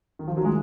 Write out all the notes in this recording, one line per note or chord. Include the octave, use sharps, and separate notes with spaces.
D#3
F3
D#3 F#3
G#3